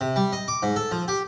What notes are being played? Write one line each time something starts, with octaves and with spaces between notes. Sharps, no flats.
C3
G3
D#5
D6
G#2
A4
F3
G4